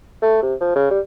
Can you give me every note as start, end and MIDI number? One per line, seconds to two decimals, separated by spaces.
0.22 0.40 57
0.42 0.54 48
0.60 0.71 53
0.76 0.85 49
0.91 1.00 55